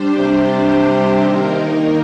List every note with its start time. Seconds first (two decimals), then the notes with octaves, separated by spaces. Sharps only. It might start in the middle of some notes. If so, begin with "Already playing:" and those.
Already playing: G3 D4 G4 C5
0.18 C3
1.20 D#3 A#3 D#4 A#4